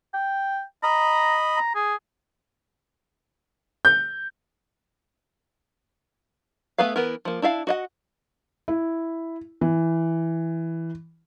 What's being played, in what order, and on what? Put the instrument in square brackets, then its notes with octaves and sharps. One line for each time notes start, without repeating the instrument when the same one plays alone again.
[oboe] G5
[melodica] D#5 B5 [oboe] A#5
[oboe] A#5
G#4
[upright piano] G6
[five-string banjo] A3 B3 G#4 B4 F5
E3 B3 A#4
F3 A#3
D4 E4 E5 F5 A5
F#4 D#5 F#5
[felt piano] E4
E3